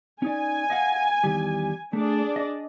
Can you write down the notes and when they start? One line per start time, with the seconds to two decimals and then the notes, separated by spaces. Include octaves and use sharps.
0.22 C#4 D#4 D5 G#5
0.70 D#5 F5 F#5
1.24 E2 D#3 G3
1.93 A3 D4 G#4 D5
2.36 D#5